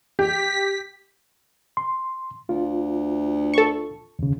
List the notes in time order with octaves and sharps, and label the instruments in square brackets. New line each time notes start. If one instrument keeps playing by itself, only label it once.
[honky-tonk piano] G4 [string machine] B6
[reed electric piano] C6
[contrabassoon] D2 [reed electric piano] F4
[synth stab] A4 C#6
[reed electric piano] D#2 C#3